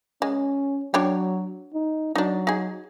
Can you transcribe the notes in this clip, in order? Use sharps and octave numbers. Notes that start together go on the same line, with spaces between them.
G#3 C#4
F#3 D4 C#5 G5
D#4
F#3 D4 D#4
D#4 G#4